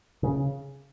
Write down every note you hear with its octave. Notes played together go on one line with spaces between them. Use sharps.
C#3